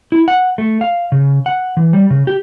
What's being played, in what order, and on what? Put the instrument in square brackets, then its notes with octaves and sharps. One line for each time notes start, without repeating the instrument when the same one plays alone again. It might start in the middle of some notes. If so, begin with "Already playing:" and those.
[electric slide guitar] E4
F#5
A3
F5
C#3
F#5
E3
G3
C#3
G4